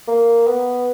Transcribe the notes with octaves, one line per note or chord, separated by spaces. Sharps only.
A#3
B3